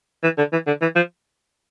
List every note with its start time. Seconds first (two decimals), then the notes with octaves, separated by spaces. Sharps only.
0.23 E3
0.38 D3
0.52 E3
0.67 D3
0.82 E3
0.95 F3